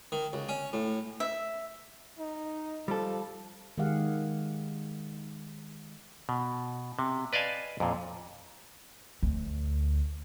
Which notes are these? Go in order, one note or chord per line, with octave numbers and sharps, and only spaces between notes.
D#3
C#2
C#4
A2
E5
D#4
F3 G3 A4
D#3 G#3 G4 G#4 F5 F#5
B2
C3
B4 D5 D#5 F5 G#5 A5
F2 A#2
D2